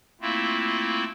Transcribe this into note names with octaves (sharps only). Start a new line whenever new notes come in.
A3 A#3 C4 E4 F4